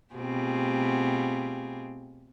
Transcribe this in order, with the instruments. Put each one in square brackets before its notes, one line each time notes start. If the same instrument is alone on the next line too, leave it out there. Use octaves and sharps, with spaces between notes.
[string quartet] B2 A3 C4 F4 G4 G#4